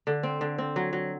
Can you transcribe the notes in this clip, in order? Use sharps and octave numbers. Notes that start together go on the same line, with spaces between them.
D3
C4
D3
C4
F#3
F#3